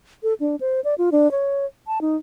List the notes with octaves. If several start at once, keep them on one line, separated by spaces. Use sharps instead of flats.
A4
D4
C5
D5
F4
D4
C#5
A5
D#4